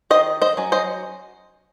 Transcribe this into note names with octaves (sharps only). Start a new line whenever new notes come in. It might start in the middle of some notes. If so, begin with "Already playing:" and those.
D#3 C5 D#5
C5 D#5
F#3 C#4
C5 D#5